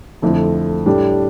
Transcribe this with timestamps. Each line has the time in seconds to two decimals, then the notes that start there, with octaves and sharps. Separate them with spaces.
0.22 F2 D3 F3 A3 E4
0.86 A2 G3 D4 G4